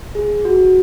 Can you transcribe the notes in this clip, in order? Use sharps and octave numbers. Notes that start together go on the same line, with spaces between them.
G#4
F#4